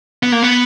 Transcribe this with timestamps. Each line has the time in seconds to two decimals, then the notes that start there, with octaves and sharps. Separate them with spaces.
0.23 B3
0.32 A#3
0.43 B3